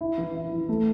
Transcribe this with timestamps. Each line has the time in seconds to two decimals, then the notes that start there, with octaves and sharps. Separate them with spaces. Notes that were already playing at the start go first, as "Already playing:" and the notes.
0.01 E4
0.18 E3
0.35 E4
0.52 E3
0.69 A3